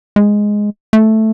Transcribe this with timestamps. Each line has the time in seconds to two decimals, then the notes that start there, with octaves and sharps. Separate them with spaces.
0.16 G#3
0.93 A3